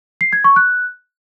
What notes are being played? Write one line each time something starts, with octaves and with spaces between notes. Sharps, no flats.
C7
G#6
C#6
F#6